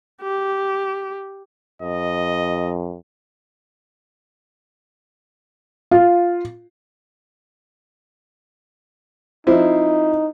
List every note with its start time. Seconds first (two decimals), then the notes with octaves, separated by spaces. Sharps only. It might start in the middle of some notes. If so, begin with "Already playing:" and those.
0.22 G4
1.82 F2 D#5
5.91 F4
9.47 F3 C4 D#4 E4